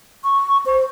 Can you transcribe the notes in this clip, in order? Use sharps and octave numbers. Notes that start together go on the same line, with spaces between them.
C#6
C5